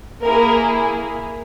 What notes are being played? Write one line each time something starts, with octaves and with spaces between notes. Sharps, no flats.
A#3 E4 G#4 A#4